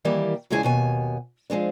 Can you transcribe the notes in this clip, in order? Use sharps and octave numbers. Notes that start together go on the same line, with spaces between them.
D#3 E3 G3 A#3 G4
E2 C#3 G#3 E4 G#4 G#5
D#2 B2 G#5
F3 G#3 C4 D4